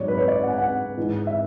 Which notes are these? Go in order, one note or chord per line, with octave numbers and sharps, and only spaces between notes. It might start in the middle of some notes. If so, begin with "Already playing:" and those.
Already playing: G#2 F#3 C#5 D5
B4
C#5
D5
F#5
G#5
F#5
G#2 E3
E5